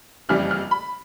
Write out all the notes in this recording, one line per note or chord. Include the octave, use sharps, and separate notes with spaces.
F#1 F2 C#3 E3 G3 F6
F6
B5